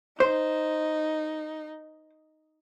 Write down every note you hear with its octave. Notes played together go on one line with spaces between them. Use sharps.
D#4 C5